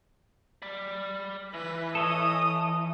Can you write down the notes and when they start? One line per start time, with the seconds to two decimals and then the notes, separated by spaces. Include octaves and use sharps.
0.62 D5 B5
1.54 E3 B4
1.95 A4 C#5 D#5 D#6